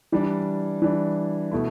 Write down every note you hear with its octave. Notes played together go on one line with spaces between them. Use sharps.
E3 G3 D4
E3 G3 D4
B2 A3 E4